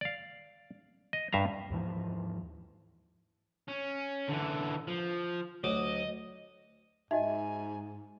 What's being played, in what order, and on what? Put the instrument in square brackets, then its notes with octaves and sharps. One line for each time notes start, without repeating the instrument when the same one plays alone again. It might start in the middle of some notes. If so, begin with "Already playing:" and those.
[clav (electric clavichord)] D5 F5
D#5
G2 E5 F5 A#5
[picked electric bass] D#2 G#2 E3 F3
[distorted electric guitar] C#4
D3 E3
F3
[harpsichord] D2 F#3 D6 [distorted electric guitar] D#5
[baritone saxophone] G#2 [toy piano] D#4 F#4 D#5 [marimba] E5 [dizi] G#5